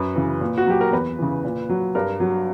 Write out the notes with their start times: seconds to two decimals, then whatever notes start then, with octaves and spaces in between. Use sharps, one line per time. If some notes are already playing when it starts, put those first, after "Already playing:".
Already playing: F#2 B4
0.16 C#3 E3
0.41 A#2
0.58 F#4
0.66 F#3 G4
0.81 A#4
0.92 E2 B4
1.19 C#3 E3
1.44 A#2
1.69 F#3
1.95 G2 A#4
2.20 F#3